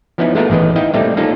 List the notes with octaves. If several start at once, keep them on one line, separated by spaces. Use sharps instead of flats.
F3 B3 C#4 D#4 E4 B4
G#3 A3 B3 F4 F#4 A#4
A1 D#3 B3 B4 D#5
D#4 E4 D#5 F5 G5
G3 A3 A#3 C4 D#4
A#3 C#4 D#4 F4 A4